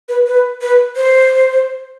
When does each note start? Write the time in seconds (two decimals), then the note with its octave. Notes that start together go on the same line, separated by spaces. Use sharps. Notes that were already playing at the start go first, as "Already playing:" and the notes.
0.09 B4
0.27 B4
0.61 B4
0.96 C5